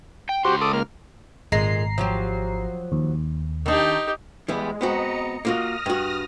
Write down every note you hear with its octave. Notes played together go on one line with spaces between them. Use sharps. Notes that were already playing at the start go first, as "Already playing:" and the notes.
G5
C#2 F#4 G4 C5 C6
A4 D6 D#6
A#3 F6
G#1 A#2 G#3 A#5 C7
F3 F#3 G4
D#2
D#3 D4 D#4 G4
E3 G3 G#3 B3
B3 C4 F#4 D#5 A#5 C#7
A#3 F4 F#4 D#6 F6 A#6
G2 F#4